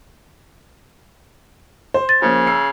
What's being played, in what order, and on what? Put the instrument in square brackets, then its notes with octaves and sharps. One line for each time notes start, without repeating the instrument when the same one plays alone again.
[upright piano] C5
[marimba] A6
[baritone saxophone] C#3 [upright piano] F3 A#3 C#4
[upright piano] A#5 E6 C7